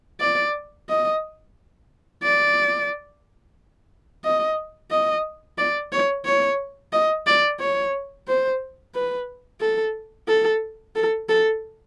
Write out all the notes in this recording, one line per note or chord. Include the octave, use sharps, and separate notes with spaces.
D5
D#5
D5
D#5
D#5
D5
C#5
C#5
D#5
D5
C#5
C5
B4
A4
A4
A4
A4